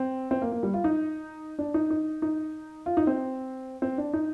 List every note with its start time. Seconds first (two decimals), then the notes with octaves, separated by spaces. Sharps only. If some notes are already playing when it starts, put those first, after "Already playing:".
Already playing: C4
0.31 C4
0.42 A#3
0.52 A#3
0.63 G3
0.74 F4
0.84 D#4
1.59 D4
1.74 D#4
1.90 D#4
2.22 D#4
2.86 F4
2.97 D#4
3.07 C4
3.82 C4
3.98 D4
4.13 D#4